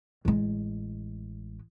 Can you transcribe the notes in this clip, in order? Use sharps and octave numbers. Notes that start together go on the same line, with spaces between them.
A1 G#3